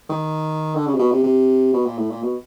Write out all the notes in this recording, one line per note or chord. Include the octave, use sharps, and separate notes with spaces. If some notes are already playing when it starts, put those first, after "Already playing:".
D#3
D3
C#3
C3
B2
C3
C3
B2
A#2
A2
A#2
B2